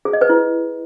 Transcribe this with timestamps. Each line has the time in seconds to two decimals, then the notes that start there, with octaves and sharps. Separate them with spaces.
0.05 G#4
0.13 D#5
0.21 B4
0.29 E4